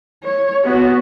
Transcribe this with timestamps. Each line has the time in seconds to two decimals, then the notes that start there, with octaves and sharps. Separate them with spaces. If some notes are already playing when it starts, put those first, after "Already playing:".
0.23 C#5
0.64 B3 F#4